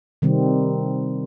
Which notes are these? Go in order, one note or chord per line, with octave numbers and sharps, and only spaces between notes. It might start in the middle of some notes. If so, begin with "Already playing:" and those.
C3 D#3 G3 C4